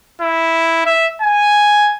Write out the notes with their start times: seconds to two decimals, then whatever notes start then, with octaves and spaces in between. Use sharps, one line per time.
0.22 E4
0.86 E5
1.22 G#5